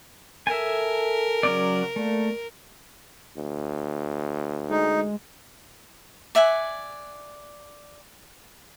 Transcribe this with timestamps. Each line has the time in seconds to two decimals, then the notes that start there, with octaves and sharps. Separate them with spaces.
0.47 A4 A#4 E5 G#5
1.43 C#3 F#3 C#4 D5
1.96 A3 A#3 D5
3.37 D2
4.70 G#3 D#4
6.35 D5 E5 F#5 G#5